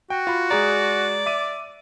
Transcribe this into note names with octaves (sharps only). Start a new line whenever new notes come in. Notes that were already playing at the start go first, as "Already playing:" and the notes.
F#4 G5
F4 B5
G#3 G#4 D5 A#5
E5 D6 D#7